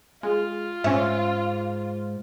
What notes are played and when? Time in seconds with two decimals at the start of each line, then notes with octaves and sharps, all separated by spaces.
0.23 G#3 F4
0.84 G#2 C#4 E5